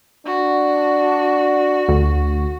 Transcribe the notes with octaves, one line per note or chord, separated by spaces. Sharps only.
D4 F#4
D2